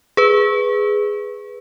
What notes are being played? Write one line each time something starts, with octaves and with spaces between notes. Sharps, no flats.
G#4 B4